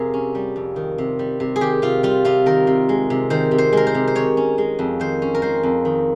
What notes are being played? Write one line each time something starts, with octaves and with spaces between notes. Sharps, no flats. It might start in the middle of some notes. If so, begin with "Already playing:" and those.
Already playing: F2 C3 F4 G#4 A#4
C#4
G3
F2
D#3
C3
G3
C3
G#4
D#3 G4
C3 F4
G3 F4
C3 F4
D#3 A#4
C3
G#3
C3
D#3 C5
C3
C5
G#3 A#4
C5
C3
C5
D#3 C#5
C#4
G#3
F2
D#3 C5
C#4
A#4
G#3 C5
F2
D#3